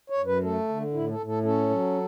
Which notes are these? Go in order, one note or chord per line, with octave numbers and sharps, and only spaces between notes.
C#5
F#2
B4
A3 A4
D3
A2 E4
A4
A2
A4
C#4 A4
F#3